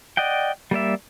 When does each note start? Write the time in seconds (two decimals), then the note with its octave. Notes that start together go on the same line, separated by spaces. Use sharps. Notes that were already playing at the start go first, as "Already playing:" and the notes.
0.17 D5 D#5 F#5 G5
0.71 G3 A#3 D5 E5